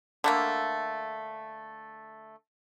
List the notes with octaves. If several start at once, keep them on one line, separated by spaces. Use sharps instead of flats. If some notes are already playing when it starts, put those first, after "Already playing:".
D3 A3 A#3